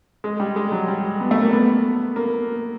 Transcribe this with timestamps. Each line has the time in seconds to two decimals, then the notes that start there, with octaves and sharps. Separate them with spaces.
0.24 G#3
0.40 G3
0.56 G#3
0.72 F#3
0.88 G3
1.20 B3
1.31 A3
1.42 A#3
1.52 B3
2.16 A#3